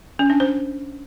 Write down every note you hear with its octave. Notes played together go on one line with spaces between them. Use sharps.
C#4
D4
C5